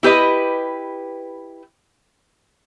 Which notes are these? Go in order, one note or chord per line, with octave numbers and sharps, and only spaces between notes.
E4 G4 B4 D#5